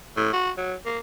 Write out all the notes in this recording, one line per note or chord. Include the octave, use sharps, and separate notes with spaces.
A2
F#4
F#3
A#3